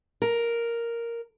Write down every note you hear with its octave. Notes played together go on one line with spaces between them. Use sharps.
A#4